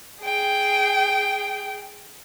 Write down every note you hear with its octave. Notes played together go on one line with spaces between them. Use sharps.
G#4 G5